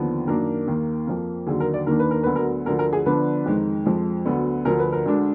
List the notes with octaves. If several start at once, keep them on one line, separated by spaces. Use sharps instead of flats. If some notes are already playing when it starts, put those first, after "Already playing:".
Already playing: D#2 D3 F3 B3
F#2 D#3 A#3 D4 A#4
D#2 D#3 A#3
F2 F3 A#3
D#2 D3 F#3 G#4
A#4
D5
D#2 D#3 A#3 D4 A#4
B4
A#4
D2 D3 F#3 B3 B4
A#4
D2 D3 F3 A#4
A#4
G#4
D3 F3 B3 D4 B4
F2 D#3 G#3 D#4
F2 F3 G#3
D2 D3 F#3 B3
D2 D3 F3 A#4
B4
A#4
D2 D3 G#3 D4